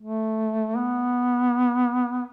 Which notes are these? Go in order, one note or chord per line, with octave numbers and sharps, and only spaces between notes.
A3
B3